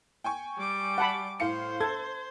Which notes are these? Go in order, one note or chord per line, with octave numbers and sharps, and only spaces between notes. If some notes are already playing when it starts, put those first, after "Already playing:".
G5 G#5 C#6
G3 D6
F#5 A5 B5
A2 C5 F5 C#7
A4 G#6